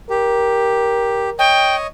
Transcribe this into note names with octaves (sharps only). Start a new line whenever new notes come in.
G4 A#4
C#5 D#5 G5